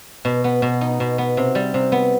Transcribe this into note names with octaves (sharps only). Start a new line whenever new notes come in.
B2
B3
B2
D#4
B2
B3
C3
G3
C3
B3